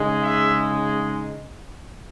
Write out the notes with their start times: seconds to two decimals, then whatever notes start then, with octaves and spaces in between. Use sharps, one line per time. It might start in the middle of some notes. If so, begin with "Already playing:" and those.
Already playing: C#3 G#3 D#4
0.22 E5